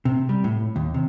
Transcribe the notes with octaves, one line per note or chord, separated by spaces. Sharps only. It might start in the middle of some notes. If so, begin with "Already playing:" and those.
C3
G3
A2
D#2
C3